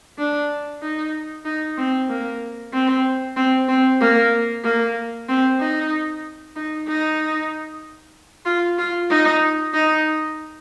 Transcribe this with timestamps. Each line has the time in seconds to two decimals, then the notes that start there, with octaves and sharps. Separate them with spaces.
0.18 D4
0.82 D#4
1.45 D#4
1.78 C4
2.09 A#3
2.73 C4
3.36 C4
3.68 C4
4.01 A#3
4.64 A#3
5.28 C4
5.59 D#4
6.56 D#4
6.88 D#4
8.46 F4
8.78 F4
9.10 D#4
9.74 D#4